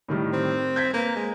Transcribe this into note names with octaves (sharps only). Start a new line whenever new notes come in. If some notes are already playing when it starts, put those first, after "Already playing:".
A2 D#3 G3
C4
G6 G#6 B6
A#3 B4
G#3